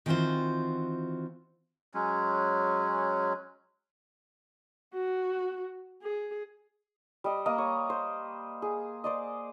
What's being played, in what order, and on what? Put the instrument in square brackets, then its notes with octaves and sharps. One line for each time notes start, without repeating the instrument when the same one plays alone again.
[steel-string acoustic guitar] D#3 E3 C4 F4 F#4 C5
[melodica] F#3 G#3 C#4
[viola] F#4
G#4
[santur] G3 D#5
A#3 D#5 A#5
C#5
C5
G#4
C5 D5 D#5